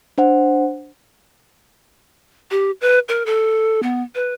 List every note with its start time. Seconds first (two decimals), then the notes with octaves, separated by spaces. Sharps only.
0.18 D4 C5 F#5
2.51 G4
2.81 B4
3.09 A#4
3.26 A4
3.83 B3
4.15 B4